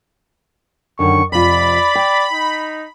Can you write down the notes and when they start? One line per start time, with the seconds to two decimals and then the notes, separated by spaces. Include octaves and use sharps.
0.99 F#2 D3 D#3 C#6
1.32 F2 C3 F4 D5 B5
1.95 G5
2.33 D#4